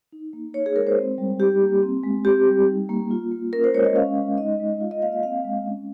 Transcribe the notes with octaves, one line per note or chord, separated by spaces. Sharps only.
D#4
A#3
D#4 C#5
G#4
G#3 A#4
C5
C4
G3
D#4 G4
A#3
C4
G#3
C4 G4
G3
D#4
A#3
F4
A#3
C#4 A#4
C5
G#3 C#5
D#5
C#4 F5
G#3
D#4 D#5
G#3
F4 F5
D#5
A#3 F5
D#5
C4 F5
G#3
C#4